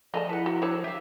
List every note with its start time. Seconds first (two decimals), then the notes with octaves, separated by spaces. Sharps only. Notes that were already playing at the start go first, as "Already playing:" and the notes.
0.14 F3 A3 G#4 D5 D#5 F5 A5
0.29 E4 B4 F#5
0.46 F#4 A#4
0.62 D4 C5 C#5 E6 F#6
0.84 G4 E5 F5